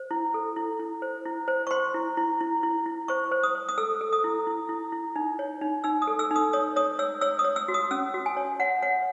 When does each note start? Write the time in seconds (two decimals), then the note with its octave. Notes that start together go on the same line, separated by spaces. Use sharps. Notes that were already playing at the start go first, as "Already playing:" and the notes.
Already playing: C5
0.11 E4
0.34 A4
0.56 E4
0.79 E4
1.02 C5
1.25 E4
1.48 C5
1.67 C#6
1.71 C5 C6
1.94 E4
2.17 E4
2.41 E4
2.63 E4
2.86 E4
3.08 C5 C#6
3.32 C5
3.43 D#6
3.55 C5
3.69 D#6
3.78 A4 E6
4.01 A4
4.13 D#6
4.24 E4
4.47 E4
4.69 E4
4.92 E4
5.16 D#4
5.39 C#5
5.61 D#4
5.84 D#4 E6
6.02 D#6
6.07 A4
6.19 E6
6.31 D#4
6.36 D#6
6.53 C#5 D#6
6.76 C#5 D#6
6.99 C#5 E6
7.21 C#5 E6
7.39 D#6
7.44 C#5
7.56 E6
7.68 F#4
7.74 D#6
7.91 C#4 E6
8.14 F#4
8.26 G#5
8.37 C#5
8.60 C#5 F#5
8.82 C#5 F#5